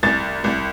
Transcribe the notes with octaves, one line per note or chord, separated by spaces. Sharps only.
C2 A6
C2